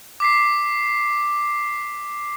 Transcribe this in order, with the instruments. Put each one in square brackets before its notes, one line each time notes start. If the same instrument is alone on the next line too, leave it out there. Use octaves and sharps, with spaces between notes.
[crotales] D6 B6 C7